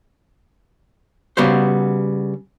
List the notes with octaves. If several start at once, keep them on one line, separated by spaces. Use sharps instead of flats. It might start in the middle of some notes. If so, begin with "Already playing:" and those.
C#3 G3 B3 F#4 C5